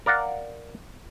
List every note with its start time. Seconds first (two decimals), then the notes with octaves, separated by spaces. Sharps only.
0.06 A#4 D5 F5 F#5